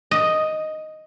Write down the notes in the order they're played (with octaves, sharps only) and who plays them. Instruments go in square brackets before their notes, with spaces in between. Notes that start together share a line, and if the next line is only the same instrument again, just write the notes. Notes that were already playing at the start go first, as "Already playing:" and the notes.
[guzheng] D#5